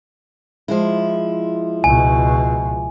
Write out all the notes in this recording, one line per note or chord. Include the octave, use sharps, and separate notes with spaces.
F3 G#3 E4
C#2 B2 G#5